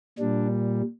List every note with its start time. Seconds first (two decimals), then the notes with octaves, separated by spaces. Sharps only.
0.18 A#2 G3 D4